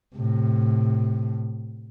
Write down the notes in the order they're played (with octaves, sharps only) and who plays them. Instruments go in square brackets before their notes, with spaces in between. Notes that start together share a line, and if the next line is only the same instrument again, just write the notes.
[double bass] A2 C3